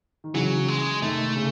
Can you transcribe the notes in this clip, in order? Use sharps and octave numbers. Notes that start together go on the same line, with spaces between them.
D#3
C#3 E3 F#3
G#3
C3 D#3 A3
C#3